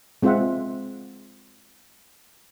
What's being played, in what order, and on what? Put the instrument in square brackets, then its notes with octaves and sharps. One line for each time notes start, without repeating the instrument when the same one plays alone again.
[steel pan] G#3 C4 F4 C5 E5 F#5